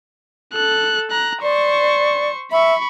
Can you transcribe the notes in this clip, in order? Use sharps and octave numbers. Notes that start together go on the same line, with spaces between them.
A4 F#6
A#5 F#6
C5 D5 C#6
E5 B5 C#6